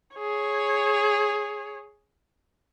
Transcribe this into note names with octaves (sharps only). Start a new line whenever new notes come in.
G#4 C#5